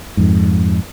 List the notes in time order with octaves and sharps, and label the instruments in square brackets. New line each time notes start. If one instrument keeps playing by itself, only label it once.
[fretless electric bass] F2 G#2